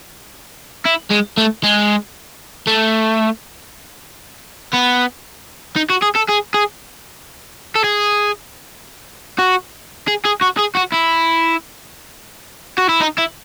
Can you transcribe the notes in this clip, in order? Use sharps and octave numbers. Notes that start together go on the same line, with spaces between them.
E4
G#3
A3
G#3
A3
B3
D#4
F#4
G#4
A4
G#4
G#4
A4
G#4
F#4
G#4
G#4
F#4
G#4
F#4
E4
F#4
E4
D#4
E4